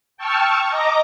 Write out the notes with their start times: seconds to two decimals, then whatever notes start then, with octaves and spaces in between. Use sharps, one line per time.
0.17 G5 A5 C#6 E6 F6
0.69 D#5 A#5 D6 D#6